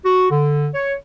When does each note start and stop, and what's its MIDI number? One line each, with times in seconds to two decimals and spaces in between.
0.05 0.26 66
0.31 0.68 50
0.74 0.94 73